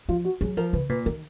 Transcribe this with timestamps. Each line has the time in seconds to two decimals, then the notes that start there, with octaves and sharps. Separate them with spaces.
0.09 F3 F4
0.25 F#4
0.41 F#3 G#4
0.57 F3 A#4
0.73 C#3 B4
0.89 A#2 B4
1.06 D#3 A#4